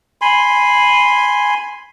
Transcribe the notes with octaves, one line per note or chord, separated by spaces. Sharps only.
G#5 B5 C6